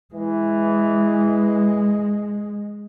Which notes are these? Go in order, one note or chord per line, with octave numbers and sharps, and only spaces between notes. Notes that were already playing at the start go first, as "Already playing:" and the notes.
E3 G#3